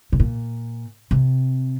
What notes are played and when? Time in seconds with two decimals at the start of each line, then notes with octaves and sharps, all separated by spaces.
0.12 C3
0.20 A#2
1.11 C3